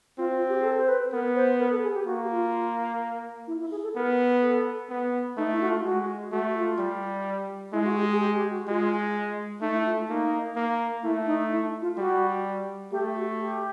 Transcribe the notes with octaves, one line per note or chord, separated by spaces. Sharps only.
C4 F4
F4
G4
G#4
A4
C5
B4
B3 A#4
C5
A#4
A4
G#4
G4
A#3 F#4
F4
E4
E4
G#4
A4
B3 A#4
A4
B3
A3 D#4
E4
F#4
F4
G#3 F#4
A3 F#4
F4
G3
G#3 E4
F#4
G4
G#4
G4
G4
F#4
G#3 F4
A3 D#4
E4
F4
A#3 D#4
A#3
A3 E4
D#4
E4
F4
G3 F#4
A3 G4
F#4
G4